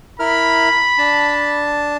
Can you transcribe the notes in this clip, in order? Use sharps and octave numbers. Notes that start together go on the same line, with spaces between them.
E4 A#4 B5 F6
D4 A5